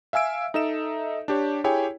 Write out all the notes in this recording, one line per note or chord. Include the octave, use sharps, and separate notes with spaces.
E5 F5 G#5 E6 D7
D#4 A4 D#5 E5 E7
D4 G4 C#5
E4 G4 G#4 C#5 G5 G#5